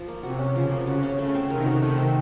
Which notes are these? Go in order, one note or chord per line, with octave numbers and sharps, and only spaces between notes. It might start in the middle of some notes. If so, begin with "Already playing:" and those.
Already playing: F3
A#3
C3 F#4
C#4
C#3 F3
A#3
C#3 F#4
C#4
C#3 A3
C4
C3 D#3 A#4
F#4
C3 D#3 A3
C4